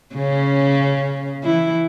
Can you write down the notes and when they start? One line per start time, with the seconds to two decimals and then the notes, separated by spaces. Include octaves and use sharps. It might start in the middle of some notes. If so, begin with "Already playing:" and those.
0.15 C#3 C#4
1.43 E3 E4